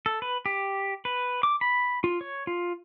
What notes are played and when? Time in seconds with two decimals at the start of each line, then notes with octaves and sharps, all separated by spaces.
0.06 A4
0.22 B4
0.46 G4
1.05 B4
1.43 D6
1.61 B5
2.04 F4
2.21 C#5
2.47 F4